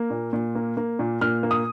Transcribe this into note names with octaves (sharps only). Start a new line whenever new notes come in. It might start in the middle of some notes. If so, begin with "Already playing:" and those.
Already playing: A#3
A#2
A#2
A#3
A#3
A#2
A#2 F6
A#3
D#6